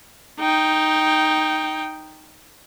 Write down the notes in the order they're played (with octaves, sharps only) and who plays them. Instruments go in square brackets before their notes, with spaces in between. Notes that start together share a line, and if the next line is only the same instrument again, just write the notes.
[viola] D#4 G5